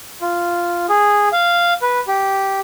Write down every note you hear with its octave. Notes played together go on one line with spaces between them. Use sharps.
F4
G#4
F5
B4
G4